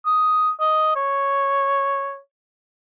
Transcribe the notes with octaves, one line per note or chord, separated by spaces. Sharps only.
D#6
D#5
C#5